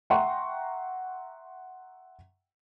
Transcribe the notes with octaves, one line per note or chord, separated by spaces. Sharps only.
E5 F#5 G5 A#5 C6 C#6